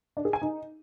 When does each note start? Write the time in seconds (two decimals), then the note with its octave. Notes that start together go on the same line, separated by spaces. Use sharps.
0.17 D4
0.25 G#4
0.33 G#5
0.42 D#4